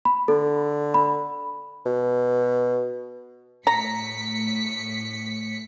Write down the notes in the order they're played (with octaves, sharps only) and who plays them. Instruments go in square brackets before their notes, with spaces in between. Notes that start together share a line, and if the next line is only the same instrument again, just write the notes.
[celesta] B5
[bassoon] D3 [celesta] A4
[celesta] B5
[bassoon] B2
[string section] A2 B6 C#7 [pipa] A#5